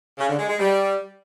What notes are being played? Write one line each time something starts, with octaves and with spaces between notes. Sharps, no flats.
C#3
D3
G#3
G#3
G3